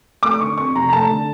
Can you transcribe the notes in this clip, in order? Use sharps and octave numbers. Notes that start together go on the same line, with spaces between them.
A3 D6
D3 C#6
F2 C#6
F1 A#5
A#5
A3 A5
D3